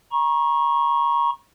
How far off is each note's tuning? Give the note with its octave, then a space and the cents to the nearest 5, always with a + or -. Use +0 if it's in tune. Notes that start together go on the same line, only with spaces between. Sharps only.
A#5 +30 C#6 -20